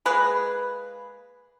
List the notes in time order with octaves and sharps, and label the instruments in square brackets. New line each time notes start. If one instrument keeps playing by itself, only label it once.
[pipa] G#3 A#3 G#4 B4